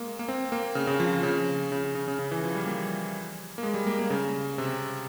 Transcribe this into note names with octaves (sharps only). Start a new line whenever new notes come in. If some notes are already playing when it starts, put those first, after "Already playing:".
Already playing: G#3 A#3
A#3
C4
A#3
C#3
C#3
F3
C#3
C#3
C#3
C#3
C#3
E3
F3
G3
A#3
A#3
G#3
G3
A#3
A#3
C#3
C3